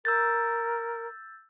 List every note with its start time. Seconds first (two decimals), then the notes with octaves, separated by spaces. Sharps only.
0.05 A#4 E6 G6 A6